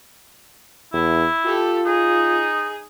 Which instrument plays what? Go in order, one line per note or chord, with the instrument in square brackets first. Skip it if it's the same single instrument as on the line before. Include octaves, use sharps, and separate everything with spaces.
[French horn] E2 [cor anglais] E4
[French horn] F4 [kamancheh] G4 A4
[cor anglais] D#4 [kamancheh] G#4